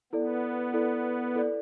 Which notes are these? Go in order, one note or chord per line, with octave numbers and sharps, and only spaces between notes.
B3 E4 A4 D5
E4 A4 D5
E4 A4 D5